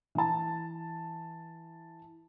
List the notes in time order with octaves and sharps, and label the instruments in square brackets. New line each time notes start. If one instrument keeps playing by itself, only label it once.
[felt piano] E3 A5